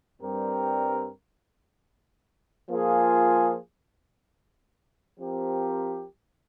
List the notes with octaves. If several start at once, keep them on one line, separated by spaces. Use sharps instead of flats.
G2 G3 C4 G4 A#4
F3 A#3 F4 G#4
F3 C4 G4 A#4